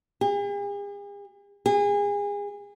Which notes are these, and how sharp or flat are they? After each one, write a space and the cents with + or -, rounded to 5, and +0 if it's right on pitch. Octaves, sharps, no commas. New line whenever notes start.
G#4 -45
G#4 -30